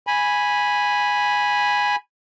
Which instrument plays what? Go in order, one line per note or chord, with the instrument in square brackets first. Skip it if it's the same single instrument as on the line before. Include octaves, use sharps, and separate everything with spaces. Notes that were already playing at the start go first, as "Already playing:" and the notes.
[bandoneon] G#5 B5